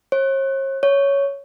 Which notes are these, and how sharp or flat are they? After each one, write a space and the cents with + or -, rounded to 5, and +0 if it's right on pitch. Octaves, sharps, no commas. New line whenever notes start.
C#5 -45
C#5 +5